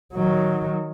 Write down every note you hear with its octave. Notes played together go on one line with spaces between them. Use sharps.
D#3 F#3